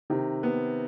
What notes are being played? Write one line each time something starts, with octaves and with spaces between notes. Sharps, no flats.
C3 D#3
B3